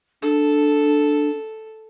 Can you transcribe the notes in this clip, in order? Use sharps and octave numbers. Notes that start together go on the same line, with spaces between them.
D4 A4